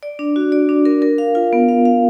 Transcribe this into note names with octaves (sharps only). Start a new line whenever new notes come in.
D5
D4
F#4
D5
D4
A#4
A#4
F5
F4
B3
F5
F5